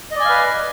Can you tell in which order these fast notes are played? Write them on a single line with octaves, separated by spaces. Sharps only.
D#5 D5 G#5 F5 B4